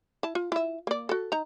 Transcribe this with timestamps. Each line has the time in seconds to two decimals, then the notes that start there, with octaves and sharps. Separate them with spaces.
0.23 E4 A5
0.35 F4
0.52 E4 E5
0.87 A#3 D5
1.09 F#4 A4
1.32 D#4 A#5